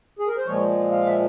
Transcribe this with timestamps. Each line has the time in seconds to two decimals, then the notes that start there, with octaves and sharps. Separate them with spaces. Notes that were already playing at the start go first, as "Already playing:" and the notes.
0.19 G#4
0.27 A#4
0.38 C5
0.46 A#2 F3 G#3 C#5
0.91 F5
1.06 E5